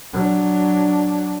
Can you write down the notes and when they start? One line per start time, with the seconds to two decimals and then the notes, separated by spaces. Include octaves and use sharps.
0.13 F#3 D4